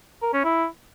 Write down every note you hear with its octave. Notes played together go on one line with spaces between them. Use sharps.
A#4
C#4
E4